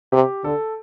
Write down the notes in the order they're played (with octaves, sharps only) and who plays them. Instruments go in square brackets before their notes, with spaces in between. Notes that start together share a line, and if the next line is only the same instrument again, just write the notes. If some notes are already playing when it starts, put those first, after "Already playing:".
[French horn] C3 [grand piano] G4
[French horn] D3 [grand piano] A4